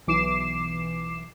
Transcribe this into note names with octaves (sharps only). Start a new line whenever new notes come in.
B1 E3 D6 C7 E7